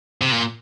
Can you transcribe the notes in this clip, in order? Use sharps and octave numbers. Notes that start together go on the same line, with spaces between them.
C3
A#2